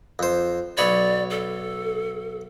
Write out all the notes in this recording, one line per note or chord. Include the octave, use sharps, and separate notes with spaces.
F2 C5
B1 C#5 D5 B5
A4